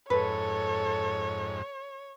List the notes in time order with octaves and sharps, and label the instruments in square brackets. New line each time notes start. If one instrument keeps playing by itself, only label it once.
[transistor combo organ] F2 G#2 [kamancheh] A4 [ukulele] B4 [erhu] C#5